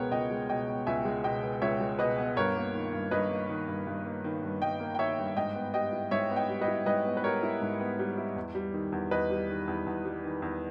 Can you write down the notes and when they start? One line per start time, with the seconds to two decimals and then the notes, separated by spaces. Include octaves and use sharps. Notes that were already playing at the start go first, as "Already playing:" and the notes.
Already playing: C#2 B2 G#3 B3 A#4 C#5 G5
0.12 C#2 D#5 G5
0.30 G#3
0.49 B2 D#5 G5
0.68 B3
0.87 C#2 E5 G#5
1.05 G#3
1.24 B2 D#5 G5
1.43 B3
1.62 C#2 C#5 E5
1.81 G#3
1.99 B2 B4 D#5
2.18 B3
2.37 G2 A#4 C#5
2.56 A#3
2.74 D#3
2.93 G2
3.11 G2 B4 D#5
3.30 A#3
3.49 D#3
3.68 G2
3.87 G2
4.06 A#3
4.24 D#3
4.43 G2
4.61 G2 D#5 G5
4.80 A#3
4.95 G5
4.99 D#3 C#5 E5
5.18 G2
5.26 E5
5.37 G#2 D#5 G5
5.55 B3
5.74 G3 D#5 G5
5.93 E4
6.11 G#2 C#5 E5
6.30 B3
6.36 D#5 G5
6.49 G3
6.61 B4 D#5
6.68 E4
6.86 G#2 B4 D#5
7.05 B3
7.17 B4
7.24 G3 A#4 C#5
7.43 E4
7.62 G#2
7.80 B3
7.99 G3
8.18 E4
8.36 E2
8.55 G3
8.74 D#3
8.92 E2
9.11 E2 B4 D#5
9.30 G3
9.49 D#3
9.68 E2
9.86 E2
10.05 G3
10.24 D#3
10.42 E2